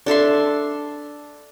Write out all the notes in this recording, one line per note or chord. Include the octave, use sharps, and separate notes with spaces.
D4 A4 E5 C6